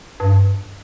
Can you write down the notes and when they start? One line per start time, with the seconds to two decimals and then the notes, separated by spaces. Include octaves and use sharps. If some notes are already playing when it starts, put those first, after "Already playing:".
0.20 G2